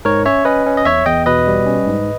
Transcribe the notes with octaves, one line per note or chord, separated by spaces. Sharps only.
G#2 A#4 C#5
C#4 C#5 E5
C#4 B4 D#5
C#4
D#5
E2 C#5 E5
E2 D#5 G5
B2 B4 D#5
G3
C#4
G#2